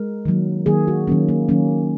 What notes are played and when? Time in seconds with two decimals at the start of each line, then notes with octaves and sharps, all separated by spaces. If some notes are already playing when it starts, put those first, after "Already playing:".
Already playing: G#3 A#4
0.25 D#3 F#3 A#3
0.66 D#3 F#3 A#3 G#4
0.88 F#4
1.07 D#3 F#3 A#3 C#4
1.29 A#3
1.49 D#3 F#3 A#3 C#4